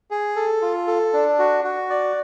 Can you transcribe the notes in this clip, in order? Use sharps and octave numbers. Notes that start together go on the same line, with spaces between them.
G#4
A4
F4
A4
D4
F#4
F#4
D5